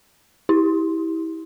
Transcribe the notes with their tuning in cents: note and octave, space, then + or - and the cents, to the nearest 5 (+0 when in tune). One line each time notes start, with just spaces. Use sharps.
E4 -25 G4 +0